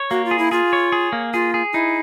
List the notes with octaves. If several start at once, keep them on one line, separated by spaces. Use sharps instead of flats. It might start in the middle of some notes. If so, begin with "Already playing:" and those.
Already playing: C#5
A#3 F#4
F4
G#4
E4
F4 G#4
C#5
G#4
A#3
F4 G#4
G#4
D#4 E4